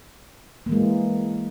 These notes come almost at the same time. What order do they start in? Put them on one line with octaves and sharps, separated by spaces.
A#3 E3 G#3